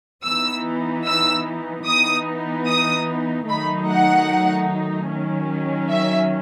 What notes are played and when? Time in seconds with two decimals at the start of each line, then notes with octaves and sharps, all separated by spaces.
0.25 E3 B3 D#4 E6
1.07 E6
1.87 E3 B3 D#4 D#6
2.68 D#6
3.49 D#3 F#3 A3 D#4 B5
3.90 F#5
5.11 D#3 F#3 C#4
5.92 E5